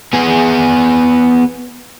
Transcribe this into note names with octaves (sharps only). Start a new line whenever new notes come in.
B3 G#4